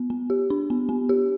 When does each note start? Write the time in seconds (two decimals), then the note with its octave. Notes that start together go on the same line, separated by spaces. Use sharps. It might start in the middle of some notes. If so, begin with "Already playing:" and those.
Already playing: B3
0.10 B3
0.30 G4
0.50 D4
0.70 B3
0.89 B3
1.09 G4